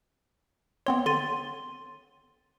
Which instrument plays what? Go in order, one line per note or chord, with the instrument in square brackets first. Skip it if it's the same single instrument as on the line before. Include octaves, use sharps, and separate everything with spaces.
[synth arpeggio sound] B3 C4 C#5 [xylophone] C6
[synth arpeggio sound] D3 [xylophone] C6 A6 D#7